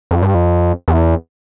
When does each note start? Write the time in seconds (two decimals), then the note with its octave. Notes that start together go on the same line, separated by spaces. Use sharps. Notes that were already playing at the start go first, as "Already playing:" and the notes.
0.11 F2
0.22 G2
0.35 F2
0.88 E2